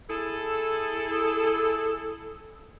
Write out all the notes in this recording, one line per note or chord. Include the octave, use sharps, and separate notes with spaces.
E4 G#4 A4